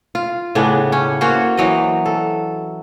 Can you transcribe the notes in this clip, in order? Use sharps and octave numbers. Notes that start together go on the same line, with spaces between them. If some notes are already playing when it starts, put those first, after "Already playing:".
F4
A2 C#3 B3 D4
C#4
A#3 C#4 F#4 C5
E3 F#3 D#5
A4